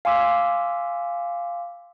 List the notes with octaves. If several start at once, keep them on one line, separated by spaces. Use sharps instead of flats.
F5 G#5 C6 D6 E6 B6